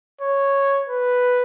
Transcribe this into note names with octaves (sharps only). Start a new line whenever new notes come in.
C#5
B4